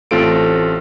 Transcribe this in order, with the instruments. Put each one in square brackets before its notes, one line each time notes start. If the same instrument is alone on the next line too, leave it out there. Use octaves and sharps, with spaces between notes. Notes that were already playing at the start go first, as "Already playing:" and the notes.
[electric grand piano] A1 A3 C4 F4 A4 D7